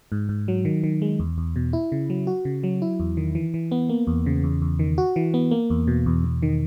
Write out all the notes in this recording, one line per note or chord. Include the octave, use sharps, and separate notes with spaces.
G#2
G#2
F#3
D#3
D#3
G#3
E2
E2
B2
E4
C#3
F#3
F#4
C#3
F#3
E4
E2
D#3
E3
E3
B3
A#3
E2
C#3
E2
E2
D#3
F#4
E3
B3
A#3
E2
B2
E2
E2
D#3